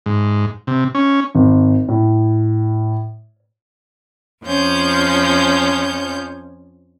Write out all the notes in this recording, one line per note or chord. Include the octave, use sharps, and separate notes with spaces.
G#2
C3
C#4
G#1
A2
F2 F3 C#4 G6